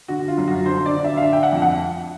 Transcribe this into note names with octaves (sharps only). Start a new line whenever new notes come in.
D3 F#4
F4
F#2
F#4
D3 C5
D5
D3
E5
F5
D3 E5
G5
F#5
F2
F#5